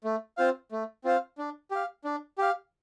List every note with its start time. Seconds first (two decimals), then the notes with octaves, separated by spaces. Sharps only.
0.04 A3
0.37 C4 F4 C5 F5
0.72 A3
1.04 C4 F4 C5 F5
1.38 D4
1.71 G4 F5
2.04 D4
2.38 G4 F5